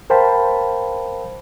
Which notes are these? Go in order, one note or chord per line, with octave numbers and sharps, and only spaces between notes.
A#4 C5 F5 G5 A5 B5